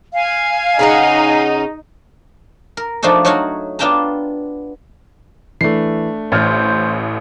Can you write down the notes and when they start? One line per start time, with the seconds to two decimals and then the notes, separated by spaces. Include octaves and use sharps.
0.13 F5 G#5
0.79 C#3 C#4 D#4 F#5
2.77 A#4
3.03 F3 A3 D4 D#4 A4
3.25 F#3 D#4 F#4 C#5 F5 F#5
3.79 B3 D4 F4 G5 A5 A#5
5.61 E3 A3 D4 C7
6.32 A1 A2 C5 F6 G#6 A6